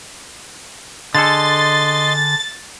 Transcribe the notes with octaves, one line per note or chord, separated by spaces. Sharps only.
D3 G#4 A4 D#5 C6 A6